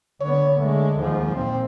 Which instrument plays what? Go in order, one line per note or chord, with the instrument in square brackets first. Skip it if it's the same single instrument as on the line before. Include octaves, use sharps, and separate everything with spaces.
[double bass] D3 B3 [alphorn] C#5
[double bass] D3 G#3 [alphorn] A3
[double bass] D#2 F3 [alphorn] G#2
[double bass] A#2 [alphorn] C4